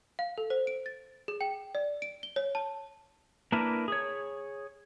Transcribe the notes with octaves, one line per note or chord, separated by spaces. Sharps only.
F5
A4
C5
D7
A6
G#4
G5
D5
D7
G7
C#5
A5
A#3 D4 E4 A#4 B4
G#4 C#5